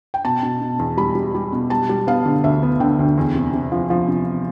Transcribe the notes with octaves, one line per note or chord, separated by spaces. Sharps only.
G5
B2 A5
B2
B2
E2
G3 B5
G3
G3
B2
G3 A5
G3
B3 F5
D3
D2 E5
B3
D3 G5
D2
E2
C3
C3
F3
F3
C3